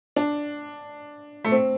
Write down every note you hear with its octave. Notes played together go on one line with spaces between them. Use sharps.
D4
A3
C4